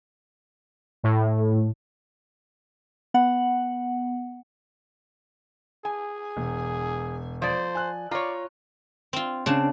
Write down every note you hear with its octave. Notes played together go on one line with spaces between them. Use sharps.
A2
B3 F#5
G#4 G#5
E1
F3 C5 D5
G#5 F#6
F4 C#5 D5 A#5
C4 F4
C#3 C4 D4